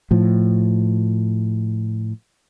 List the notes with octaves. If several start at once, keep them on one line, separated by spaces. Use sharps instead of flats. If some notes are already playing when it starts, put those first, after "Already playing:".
A2 F3